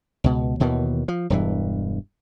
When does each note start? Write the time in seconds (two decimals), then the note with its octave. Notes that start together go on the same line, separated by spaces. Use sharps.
0.24 C#2 B2
0.60 D#2 B2 D#3 E3
1.08 F3
1.30 E1 G2 E3